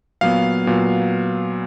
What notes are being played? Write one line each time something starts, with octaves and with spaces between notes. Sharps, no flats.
A#2 F#3 B3 F5
A#2 F#3 B3